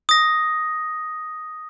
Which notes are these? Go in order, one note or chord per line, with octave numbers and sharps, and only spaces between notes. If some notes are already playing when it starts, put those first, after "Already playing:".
D#6 A#6